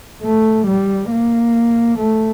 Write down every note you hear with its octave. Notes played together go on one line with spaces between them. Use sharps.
A3
G3
A#3
A3